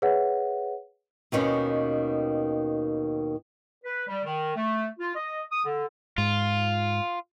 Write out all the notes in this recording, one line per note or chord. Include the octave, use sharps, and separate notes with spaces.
G#4 B4 C#5 E5 F#5
D#2 B2 D#3 C#4
B4
G3
D#3
A3
F4
D#5
D#6
D3
G#2 F4